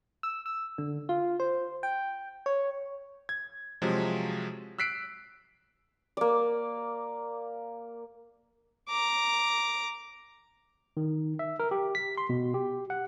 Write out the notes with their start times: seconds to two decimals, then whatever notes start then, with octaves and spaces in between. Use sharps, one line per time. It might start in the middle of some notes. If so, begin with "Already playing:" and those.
0.23 E6
0.46 E6
0.78 D3
1.09 F4
1.40 C5
1.83 G5
2.46 C#5
3.29 G#6
3.82 C3 F3 F#3 G#3
4.79 E6 F#6 B6 C7 D7
6.17 A#3 D5
8.89 A#5 D6
10.97 D#3
11.39 E5
11.60 A#4
11.71 G4
11.95 B6
12.18 C6
12.29 B2
12.54 G4
12.90 F#5